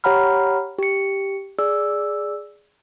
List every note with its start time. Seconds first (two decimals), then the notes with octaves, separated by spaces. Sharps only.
0.04 G4 C#5 F#5 A#5 B5 F6
0.79 G4 C#7
1.59 G#4 D5 E6